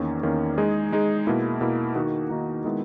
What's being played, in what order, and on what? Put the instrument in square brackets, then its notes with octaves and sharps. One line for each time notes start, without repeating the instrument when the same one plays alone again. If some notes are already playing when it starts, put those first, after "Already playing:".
Already playing: [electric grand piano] E2 D#3 A#3 C#4
E2 D#3 A#3 C#4
G#3 D#4 G#4
G#3 D#4 G#4
B2 A#3 E4
B2 A#3 E4
D#3 A#3 D#4 F#4
D#3 A#3 D#4 F#4
D#3 G#3 B3 E4